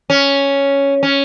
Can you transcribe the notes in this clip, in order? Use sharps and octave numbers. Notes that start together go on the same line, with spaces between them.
C#4
C#4